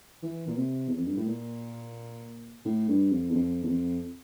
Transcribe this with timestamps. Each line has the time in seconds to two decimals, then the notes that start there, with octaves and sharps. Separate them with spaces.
0.22 E3
0.48 A#2
0.57 C3
0.88 E2
0.97 F2
1.07 G2
1.17 A2
1.27 A#2
2.65 A2
2.89 G2
3.12 F2
3.30 E2
3.35 F2
3.64 E2
3.69 F2